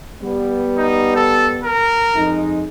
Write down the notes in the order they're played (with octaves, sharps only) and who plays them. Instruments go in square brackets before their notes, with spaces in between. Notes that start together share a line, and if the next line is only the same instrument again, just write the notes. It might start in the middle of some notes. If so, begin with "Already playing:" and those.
[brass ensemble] G3 B3
[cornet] D#4
A4
A#4
[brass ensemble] F2 G#3 D#4